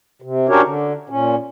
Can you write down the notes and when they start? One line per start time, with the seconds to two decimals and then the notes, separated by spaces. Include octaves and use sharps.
0.22 C3
0.49 C#4 D4 F#4 G4 A#4 C#5
0.64 D3
1.09 A#2 C#4